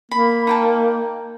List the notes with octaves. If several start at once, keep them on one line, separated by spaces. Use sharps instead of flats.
A#3 B5
D#4 G5 A5